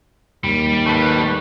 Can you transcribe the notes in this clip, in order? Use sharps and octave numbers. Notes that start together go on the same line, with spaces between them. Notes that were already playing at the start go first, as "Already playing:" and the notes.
D#2 G3
A3 B4